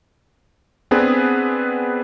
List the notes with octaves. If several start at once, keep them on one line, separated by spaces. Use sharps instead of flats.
B3 C4 D4 G#4 B4